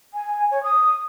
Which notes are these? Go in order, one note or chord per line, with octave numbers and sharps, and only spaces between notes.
G#5
C#5
D#6